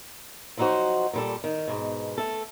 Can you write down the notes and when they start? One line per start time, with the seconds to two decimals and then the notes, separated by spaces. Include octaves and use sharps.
0.57 F3 F#3 D#4 E4 F#4 C5
1.13 A#2 G3 A4
1.44 D#3
1.67 G#2 B2
2.18 A3 A4